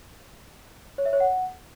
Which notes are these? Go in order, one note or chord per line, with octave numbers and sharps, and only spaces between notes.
C#5
E5
C#5
F#5